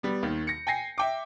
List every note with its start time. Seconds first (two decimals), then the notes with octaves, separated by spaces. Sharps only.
0.03 G3 B3
0.23 D#2 D#3
0.47 A#6 C#7
0.67 G5 G#5 A#6 C7
0.98 E5 G5 D6